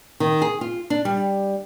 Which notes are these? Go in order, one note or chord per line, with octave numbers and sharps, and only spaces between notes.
D#3
G#4
F4
D4
G3